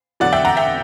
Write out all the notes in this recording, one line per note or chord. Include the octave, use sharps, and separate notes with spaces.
E2 D3 F#3 D5 F#5
E5 G5
F#5 A#5
E5 G5